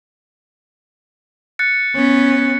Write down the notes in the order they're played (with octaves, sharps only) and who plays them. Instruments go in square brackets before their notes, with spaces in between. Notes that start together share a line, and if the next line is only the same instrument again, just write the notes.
[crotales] F#6 A6 C#7
[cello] B3 C#4